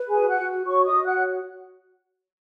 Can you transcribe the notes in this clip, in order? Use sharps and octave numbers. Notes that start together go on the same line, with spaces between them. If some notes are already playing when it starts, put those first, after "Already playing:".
Already playing: B4
G#4 G#5
F#4
F#5 F#6
F#4
F#4 C#5 C#6
D#5 D#6
F#4
F#5 F#6
C#5